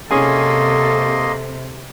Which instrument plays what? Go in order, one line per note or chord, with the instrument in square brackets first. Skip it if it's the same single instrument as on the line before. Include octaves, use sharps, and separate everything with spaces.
[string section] C3 [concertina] A#3 D#5 C6 [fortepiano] C#4 G#4 G#5 [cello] A4